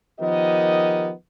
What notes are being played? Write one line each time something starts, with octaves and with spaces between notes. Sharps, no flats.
D#3 F3 B3 G4 A#4 D#5